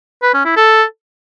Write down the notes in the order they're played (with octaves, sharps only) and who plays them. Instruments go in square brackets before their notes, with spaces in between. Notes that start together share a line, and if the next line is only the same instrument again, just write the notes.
[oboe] B4
C#4
E4
A4